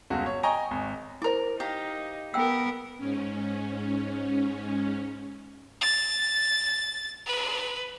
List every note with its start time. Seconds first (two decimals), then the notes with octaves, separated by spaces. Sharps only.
0.10 G1 C#2 F#4
0.26 C#5
0.43 D#5 G5 G#5 A#5 C#6
0.71 G#1
1.22 E4 A#4 C5 D6
1.60 D#4 G4 F5 A#5
2.34 B3 A#4 G5 E6
2.98 G#2 C#4
5.81 A6
7.26 B4